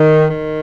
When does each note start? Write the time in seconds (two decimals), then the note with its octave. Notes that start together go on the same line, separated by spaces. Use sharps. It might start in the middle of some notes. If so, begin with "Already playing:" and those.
Already playing: D#3
0.30 D#3